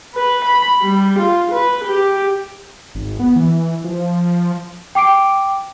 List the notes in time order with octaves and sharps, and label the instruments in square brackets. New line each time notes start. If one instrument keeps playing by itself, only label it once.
[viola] B4
B5
G3
F4
B4
G4
[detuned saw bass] G#1
B3
E3
F3
[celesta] G5 D6 C7 D7